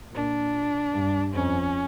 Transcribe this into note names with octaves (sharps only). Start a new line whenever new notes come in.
A#2 D4
G2
F2 C#4